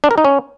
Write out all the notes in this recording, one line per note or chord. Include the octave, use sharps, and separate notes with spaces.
D4
A#4
D#4
C#4